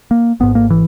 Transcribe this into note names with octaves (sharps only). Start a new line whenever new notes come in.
A#3
G#1 G#2 B3
A#3
E3